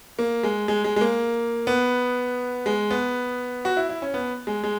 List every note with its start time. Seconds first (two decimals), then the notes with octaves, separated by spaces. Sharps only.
0.19 A#3
0.43 G#3
0.68 G#3
0.84 G#3
0.96 G#3
1.01 A#3
1.67 B3
2.66 G#3
2.91 B3
3.65 F#4
3.77 E4
3.89 E4
4.02 C#4
4.14 B3
4.47 G#3
4.64 G#3